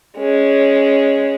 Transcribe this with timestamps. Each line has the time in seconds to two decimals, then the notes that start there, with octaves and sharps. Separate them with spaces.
0.17 G#3 C#4